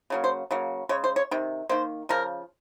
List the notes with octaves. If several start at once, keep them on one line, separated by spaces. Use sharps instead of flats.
C#3 F#3 A#3
C5
C#3 F#3 A#3
C#3 G#3 C#5
C5
C#5
C3 D#3
D#3 A#3 C5
C#3 F3 A#4